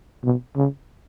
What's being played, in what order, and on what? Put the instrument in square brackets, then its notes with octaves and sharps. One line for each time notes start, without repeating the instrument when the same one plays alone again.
[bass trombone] B2
C#3